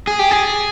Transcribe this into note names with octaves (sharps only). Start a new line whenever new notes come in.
G#4
G4
G#4